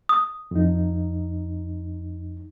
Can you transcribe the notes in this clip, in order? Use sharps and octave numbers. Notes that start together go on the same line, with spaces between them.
D#6
F2 D#4